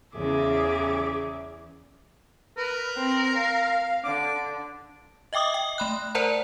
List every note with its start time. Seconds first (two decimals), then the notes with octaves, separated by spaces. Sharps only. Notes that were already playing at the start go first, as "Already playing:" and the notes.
0.16 E2 C#3 G#4 E5 D6
2.58 A#4 B4
2.96 C4
3.35 F5
4.04 D3 D6
5.33 D#5 E5 G5 D6 D#6
5.54 G5
5.78 A3 B5 F#6
6.15 A#4 C5 D5 F#5 A5 A#5